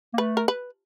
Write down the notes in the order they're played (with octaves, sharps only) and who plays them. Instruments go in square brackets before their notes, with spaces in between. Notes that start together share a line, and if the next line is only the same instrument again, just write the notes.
[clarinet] A#3
[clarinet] A3 [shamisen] B4
[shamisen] A#4
B4